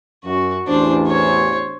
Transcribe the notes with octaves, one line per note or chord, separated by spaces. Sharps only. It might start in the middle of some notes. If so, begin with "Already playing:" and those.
F#2 F#4
A1 E2 D4 C5
C5 C#5